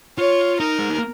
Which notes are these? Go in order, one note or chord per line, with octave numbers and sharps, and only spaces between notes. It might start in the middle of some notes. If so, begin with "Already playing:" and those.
F4 C#5
D#4 A#4
G#3
A#3